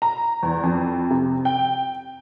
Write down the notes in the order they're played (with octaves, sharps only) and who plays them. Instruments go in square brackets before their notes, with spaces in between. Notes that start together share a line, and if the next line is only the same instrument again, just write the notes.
[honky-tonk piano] A#5
E2
F2
C3
G5